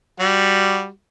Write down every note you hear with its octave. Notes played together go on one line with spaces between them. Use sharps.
G3 F#4